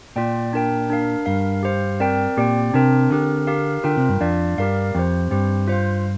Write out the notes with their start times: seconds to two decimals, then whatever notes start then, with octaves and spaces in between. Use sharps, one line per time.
0.16 A#2 F4 D5 G5
0.53 D4 A#4 G5
0.90 D4 A#4 F5
1.26 G2 D4 A#4 F5
1.63 G4 C5 F5
2.00 C4 A#4 D5 G5
2.36 A#2 C4 G4 D5 G5
2.74 C3 D4 A#4 G5
3.10 D3 C4 G4 A#4
3.47 G4 A#4 F5
3.84 D3 F4 A#4 G5
3.97 C3
4.09 G2
4.21 F2 D4 F4 D5 F5
4.58 G2 G4 A#4 D5 F5
4.95 F2 C4 G4 C5
5.31 G2 C4 G4 C5
5.68 F4 C5 F5